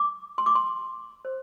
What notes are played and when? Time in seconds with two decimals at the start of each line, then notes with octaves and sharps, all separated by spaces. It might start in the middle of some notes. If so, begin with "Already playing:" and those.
Already playing: D6
0.38 C6
0.46 D6
0.55 C6
1.25 C5